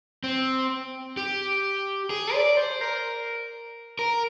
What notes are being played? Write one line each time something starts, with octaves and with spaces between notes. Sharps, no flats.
C4
G4
G#4
D5
C5
A#4
A#4